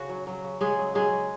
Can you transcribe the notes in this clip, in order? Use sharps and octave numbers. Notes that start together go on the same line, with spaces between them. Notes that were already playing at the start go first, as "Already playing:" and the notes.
Already playing: C#3 F#4
F#3
F#3
C#3
C#3 G#3 G#4
F#3
F#3 G#3 G#4
C#3